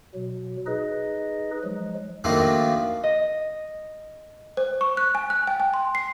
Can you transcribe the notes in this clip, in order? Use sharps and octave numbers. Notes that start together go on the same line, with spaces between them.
B2 F#3
D#4 G#4 B4 D#5
F3 F#3 G#3
D#3 F3 F#3 A3 A#3 D4
D#5
C5
C#6
F#6
G#5
F#6
G5
G#5
C6
C7